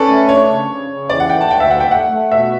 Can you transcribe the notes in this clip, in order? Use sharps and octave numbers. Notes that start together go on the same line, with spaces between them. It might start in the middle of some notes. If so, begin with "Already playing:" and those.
Already playing: C#4 A4 B4 D5
A3
D4 C#5
C#3
C#3
C#3
E3 D5
F#5
A3 G5
A5
D2 G5
E5
A3 F#5
G5
A3 F#5
A3
B2 E5